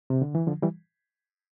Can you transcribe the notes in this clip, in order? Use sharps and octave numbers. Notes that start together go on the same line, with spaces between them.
C3
D3
E3
D3 F3
E3 G3